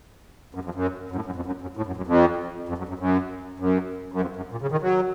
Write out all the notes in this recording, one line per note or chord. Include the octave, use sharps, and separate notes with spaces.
F#2
F2
F#2
F#2
A2
F#2
F2
F#2
F#2
A2
F#2
F#2
F2
F2
F#2
F#2
F#2
F#2
F#2
F2
F#2
A#2
C#3
D#3
F#3